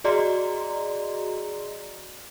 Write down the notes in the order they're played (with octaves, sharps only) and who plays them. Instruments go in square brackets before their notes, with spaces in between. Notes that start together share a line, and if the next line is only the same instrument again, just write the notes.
[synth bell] F#4 G#4 D5 D#5 A#5 C6